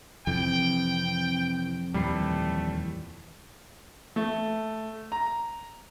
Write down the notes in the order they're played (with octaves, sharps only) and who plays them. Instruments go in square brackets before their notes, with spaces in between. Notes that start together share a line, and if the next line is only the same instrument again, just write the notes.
[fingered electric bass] F2 [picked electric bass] C3 E3 [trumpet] G5
[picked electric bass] D#2 A#2 E3 [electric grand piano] G3 B5 C7 [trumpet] A3
[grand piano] A3
A#5